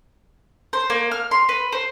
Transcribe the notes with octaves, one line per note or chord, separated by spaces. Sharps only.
C5
A#3
F6
C6
B4
C5